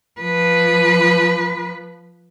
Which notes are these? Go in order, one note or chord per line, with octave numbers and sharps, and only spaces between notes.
F3 B4